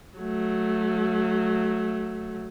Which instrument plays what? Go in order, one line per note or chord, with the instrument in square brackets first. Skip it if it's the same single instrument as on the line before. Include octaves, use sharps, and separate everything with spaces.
[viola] F#3 A3